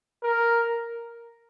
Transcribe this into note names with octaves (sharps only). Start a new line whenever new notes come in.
A#4